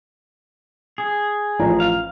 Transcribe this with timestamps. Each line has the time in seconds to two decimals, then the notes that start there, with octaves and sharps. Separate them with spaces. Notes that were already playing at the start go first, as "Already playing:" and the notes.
0.98 G#4
1.59 A1 F3 A#5
1.80 F5